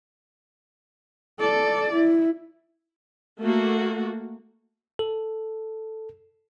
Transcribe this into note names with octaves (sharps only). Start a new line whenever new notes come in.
A4 D5
E4
A3 A#3 F#4
A4